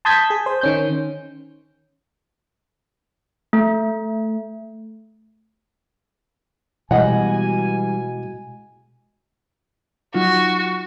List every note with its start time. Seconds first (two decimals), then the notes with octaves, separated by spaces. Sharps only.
0.05 A5 C6 D#6 G6 G#6 B6
0.30 G#4
0.46 C5
0.61 D#3 C#4 G6
3.53 A3
6.91 B2 E3 G3 G#3 D#5 F#5 G#5
10.14 F#3 D#4 F4 F#4